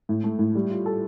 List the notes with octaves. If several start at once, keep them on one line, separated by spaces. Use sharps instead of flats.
A2
A3
A2
G3
F4
A4